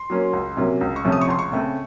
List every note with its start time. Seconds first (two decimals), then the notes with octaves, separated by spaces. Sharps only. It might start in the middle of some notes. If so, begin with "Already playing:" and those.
Already playing: C6
0.10 F#3 A#3 C#4
0.33 C#2
0.57 C3 F#3 A#3 C#4
0.81 C#2
0.96 C#6
1.05 C3 F3 A3 C#4
1.12 D#6
1.21 C#6
1.28 C#2 C6
1.39 C#6
1.51 C#3 A3 C4